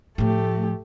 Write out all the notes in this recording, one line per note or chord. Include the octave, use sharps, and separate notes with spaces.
A2 F3 A3 G4